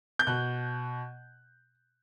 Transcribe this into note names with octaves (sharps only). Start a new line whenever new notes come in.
G6
B2 F#6